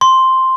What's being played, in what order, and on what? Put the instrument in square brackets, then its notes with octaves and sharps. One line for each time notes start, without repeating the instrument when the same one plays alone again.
[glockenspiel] C6